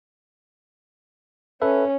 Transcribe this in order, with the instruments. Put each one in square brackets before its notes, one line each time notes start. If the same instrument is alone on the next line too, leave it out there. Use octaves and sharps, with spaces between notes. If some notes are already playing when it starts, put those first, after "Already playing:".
[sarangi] C#4 [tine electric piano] A4 B4 E5